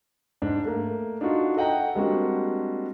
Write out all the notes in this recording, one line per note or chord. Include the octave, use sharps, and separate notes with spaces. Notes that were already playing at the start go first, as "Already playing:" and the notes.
G#2 D4
A3 A#3
D4 D#4 F4 F#4
A4 D#5 F#5 G5 A#5
G3 G#3 A#3 C4 D4 F#4